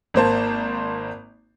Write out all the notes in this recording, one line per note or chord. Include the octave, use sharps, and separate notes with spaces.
G#1 A#3 C5 A5